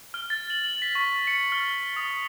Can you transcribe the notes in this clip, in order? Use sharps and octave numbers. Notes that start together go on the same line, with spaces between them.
F6
A6
F#7
F#7
B6
C#6
C#7
F6
D#6